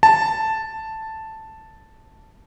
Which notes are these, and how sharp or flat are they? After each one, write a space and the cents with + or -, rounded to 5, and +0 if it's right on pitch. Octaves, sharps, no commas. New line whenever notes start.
A5 +0